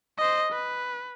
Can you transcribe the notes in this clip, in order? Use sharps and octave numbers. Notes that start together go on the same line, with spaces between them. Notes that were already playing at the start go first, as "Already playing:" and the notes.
C5 D#5
B4